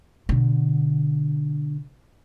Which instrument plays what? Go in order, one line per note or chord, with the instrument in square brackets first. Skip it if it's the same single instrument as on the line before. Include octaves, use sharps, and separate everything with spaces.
[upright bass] B2 D3